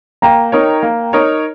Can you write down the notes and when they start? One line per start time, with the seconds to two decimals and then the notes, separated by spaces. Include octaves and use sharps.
0.22 A#3 G5 A#5
0.52 D#4 A#4 C#5
0.83 A#3
1.13 D#4 A#4 C#5